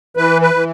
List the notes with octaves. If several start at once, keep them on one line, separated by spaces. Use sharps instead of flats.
E3 B4
B4
E3